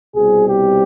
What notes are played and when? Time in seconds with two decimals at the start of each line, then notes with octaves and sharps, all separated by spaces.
0.15 C2 B2 G3 C4 G#4
0.49 G4